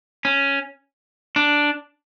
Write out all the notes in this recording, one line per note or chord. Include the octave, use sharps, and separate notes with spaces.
C#4
D4